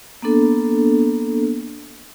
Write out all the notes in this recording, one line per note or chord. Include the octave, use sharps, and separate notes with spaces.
A#3 B3 D4 A4